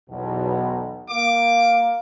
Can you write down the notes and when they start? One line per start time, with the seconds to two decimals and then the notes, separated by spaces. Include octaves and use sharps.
0.10 B1 E2 B2
1.10 A#3 F5 D6